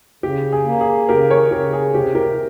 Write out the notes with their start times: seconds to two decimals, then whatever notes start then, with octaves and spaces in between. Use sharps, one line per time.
0.23 C#3 G4
0.52 G#4
0.66 A#3
0.81 G#4
1.09 C#3 G4 A#4
1.30 A#4 C#5
1.51 C#3 G4 A#4
1.73 G#4
1.94 C3 G4
2.15 G4 A#4